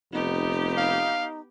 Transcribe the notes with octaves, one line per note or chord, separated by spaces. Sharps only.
F1 B3 D#4 G4
F5